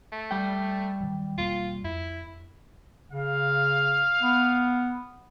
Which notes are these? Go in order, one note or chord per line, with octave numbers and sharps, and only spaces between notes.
A3
G3 G5
D#3 F#3
E1 A#3 F4
F2 E4
C#3 F5
B3